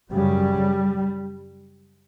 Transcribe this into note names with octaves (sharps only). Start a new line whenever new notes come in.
F#2 C#3 G3